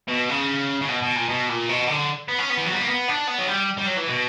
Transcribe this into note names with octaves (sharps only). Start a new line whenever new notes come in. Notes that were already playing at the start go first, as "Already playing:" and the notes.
B2
C#3
C#3
B2
B2
A#2
B2
A#2
B2
D3
B3
C#4
B3
E3
F#3
G3
A#3
B3
D4
B3
F#3
G3
G3
F#3
E3
B2